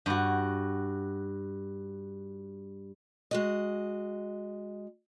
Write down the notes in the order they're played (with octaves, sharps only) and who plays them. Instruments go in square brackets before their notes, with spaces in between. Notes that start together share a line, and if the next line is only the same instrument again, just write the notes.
[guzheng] G2 F#4
[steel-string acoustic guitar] G#3 F#4 D#5